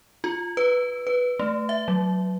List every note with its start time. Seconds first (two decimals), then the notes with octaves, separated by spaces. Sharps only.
0.24 F4
0.57 B4
1.07 B4
1.39 A3
1.69 E5
1.88 F#3